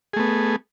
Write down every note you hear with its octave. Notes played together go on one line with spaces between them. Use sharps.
A3 B3 G#4